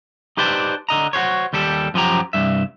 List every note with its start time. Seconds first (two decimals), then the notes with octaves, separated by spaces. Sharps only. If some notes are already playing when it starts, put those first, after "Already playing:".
0.37 D#4 G4 B4 C5 D5 A5
0.89 D3 D#5 A#5
1.13 F#4 G4 C5 C#5
1.53 D#2 G3 G4 A4
1.94 F#2 F3 F#3 G4 A#5
2.33 C2 G2 E5